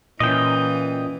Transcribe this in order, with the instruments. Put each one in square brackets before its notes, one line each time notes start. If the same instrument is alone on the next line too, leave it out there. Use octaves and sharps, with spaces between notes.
[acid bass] A#2 [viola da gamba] E3 [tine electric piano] C#4 E4 F4 [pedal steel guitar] D#5 G5